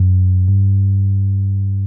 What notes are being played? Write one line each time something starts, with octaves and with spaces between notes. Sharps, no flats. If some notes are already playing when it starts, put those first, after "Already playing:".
Already playing: F#2
G2